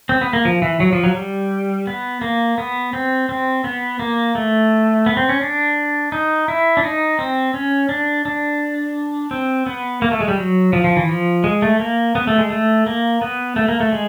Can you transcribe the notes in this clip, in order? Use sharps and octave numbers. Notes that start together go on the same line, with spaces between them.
C4
B3
A#3
F3
E3
F#3
F3
F#3
G3
B3
A#3
B3
C4
C4
B3
A#3
A3
B3
C4
C#4
D4
D#4
E4
D4
D#4
C4
C#4
D4
D4
C4
B3
A#3
A3
G#3
G3
F#3
F3
F3
E3
F3
G#3
A3
A#3
B3
A3
G#3
A3
A#3
B3
A3
A#3
A3
G#3